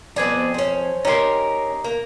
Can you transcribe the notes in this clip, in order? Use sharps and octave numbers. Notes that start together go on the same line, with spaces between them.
F2 B3 C4 G#4 D5
C#4 C5
C#4 D#4 G4 A#4 C6
A#3